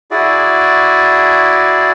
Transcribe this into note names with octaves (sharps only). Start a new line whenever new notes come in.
E4 F#4 G#4 D5